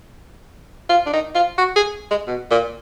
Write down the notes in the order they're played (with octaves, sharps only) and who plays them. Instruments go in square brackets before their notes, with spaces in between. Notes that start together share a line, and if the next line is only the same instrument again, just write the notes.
[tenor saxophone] F4
D4
D#4
F4
F#4
G#4
G#3
B2
A#2